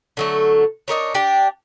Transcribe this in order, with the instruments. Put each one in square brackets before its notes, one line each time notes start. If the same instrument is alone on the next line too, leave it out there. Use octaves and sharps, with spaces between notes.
[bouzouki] D3 F#3 A3
D4 D#4 A#4 C#5
D4 G4 D5